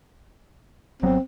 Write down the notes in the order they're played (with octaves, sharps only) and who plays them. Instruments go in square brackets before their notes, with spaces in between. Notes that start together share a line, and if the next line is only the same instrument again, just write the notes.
[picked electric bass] G#1 F#3 B3 [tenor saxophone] C4